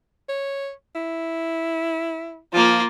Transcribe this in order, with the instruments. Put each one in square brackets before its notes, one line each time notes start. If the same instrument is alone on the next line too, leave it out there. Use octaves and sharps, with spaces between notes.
[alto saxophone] C#5
E4
[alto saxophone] F3 [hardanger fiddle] A#3 F4